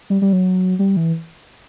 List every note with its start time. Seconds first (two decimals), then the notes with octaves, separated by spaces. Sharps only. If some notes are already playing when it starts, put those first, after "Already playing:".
0.10 G3
0.22 G3
0.33 F#3
0.79 G3
0.97 E3